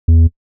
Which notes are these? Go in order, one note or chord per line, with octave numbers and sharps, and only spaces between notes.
E2